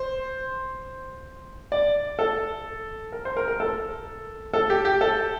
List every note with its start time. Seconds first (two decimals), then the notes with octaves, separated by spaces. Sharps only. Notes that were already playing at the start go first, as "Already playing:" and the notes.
Already playing: C5
1.72 D5
2.19 A4
3.12 A#4
3.25 C5
3.37 A#4
3.48 A#4
3.60 A4
4.54 A4
4.70 G4
4.85 G4
5.01 A4